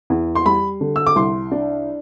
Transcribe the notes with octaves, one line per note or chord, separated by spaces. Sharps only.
E2
C6
G3 B5
D3
E6
D6
C2 C6
D4